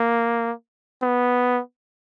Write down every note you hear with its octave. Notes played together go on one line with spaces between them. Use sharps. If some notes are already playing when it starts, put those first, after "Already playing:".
Already playing: A#3
B3